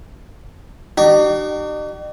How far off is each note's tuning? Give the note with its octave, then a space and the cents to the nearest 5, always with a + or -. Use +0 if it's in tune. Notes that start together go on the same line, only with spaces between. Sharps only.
D#4 -45 G4 -40